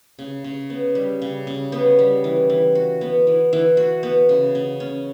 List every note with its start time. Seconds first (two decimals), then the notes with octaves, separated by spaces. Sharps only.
0.19 C#3
0.44 C#3
0.70 B3
0.95 G3
1.22 C#3
1.47 C#3
1.72 B3
1.99 G3
2.24 E3
2.50 E3
2.75 F#4
3.01 B3
3.27 E3
3.53 E3
3.77 F#4
4.03 B3
4.29 C#3
4.55 C#3
4.80 C#4